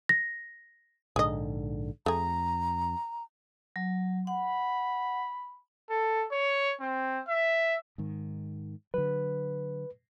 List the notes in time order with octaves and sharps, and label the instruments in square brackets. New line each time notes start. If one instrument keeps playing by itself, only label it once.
[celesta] A#6
[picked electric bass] A#1 G#2 D3 [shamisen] G#4 D#5
[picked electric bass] F2 [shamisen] A3 G#4 [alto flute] A#5
[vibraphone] F#3
[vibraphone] F#5 [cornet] B5
[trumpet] A4
C#5
C4
E5
[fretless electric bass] G#2 D#3
[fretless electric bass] D3 F#3 [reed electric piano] B4